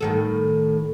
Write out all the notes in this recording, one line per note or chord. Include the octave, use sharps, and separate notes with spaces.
A2 D#3 A4